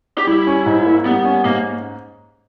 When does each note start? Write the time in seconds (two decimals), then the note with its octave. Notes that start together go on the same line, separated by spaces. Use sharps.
0.18 G4
0.27 G3 E4
0.47 C#4
0.66 G#2
0.86 A#3
1.06 G3 B3
1.25 C#4
1.45 G#2 A#3